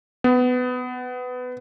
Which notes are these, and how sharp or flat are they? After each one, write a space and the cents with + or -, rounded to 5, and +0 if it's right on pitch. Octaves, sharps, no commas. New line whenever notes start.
B3 +20